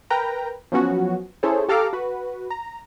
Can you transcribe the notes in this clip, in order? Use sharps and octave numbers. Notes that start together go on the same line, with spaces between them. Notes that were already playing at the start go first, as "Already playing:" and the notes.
A#4 B4 G5 A#5
F3 F#3 B3 C#4 F#4
C#4 E4 G#4 A4 C5 C#5
G4 A4 F5 A#5 D6 F6
F#4 B4
A#5